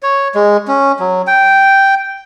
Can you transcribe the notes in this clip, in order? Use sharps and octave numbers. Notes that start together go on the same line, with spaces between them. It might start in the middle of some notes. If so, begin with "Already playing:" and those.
C#5
G#3
C#4
F#3
G5